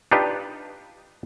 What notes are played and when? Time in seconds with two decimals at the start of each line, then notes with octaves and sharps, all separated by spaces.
0.12 D4 D#4 F4 G4 B4